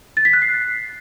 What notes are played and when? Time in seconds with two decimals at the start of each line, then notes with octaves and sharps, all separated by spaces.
0.17 A6
0.25 B6
0.33 F#6
0.42 C7